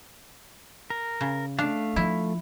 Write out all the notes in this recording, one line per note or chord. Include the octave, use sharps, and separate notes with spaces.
A#4
C#3
A3 D4 F5
F3 E4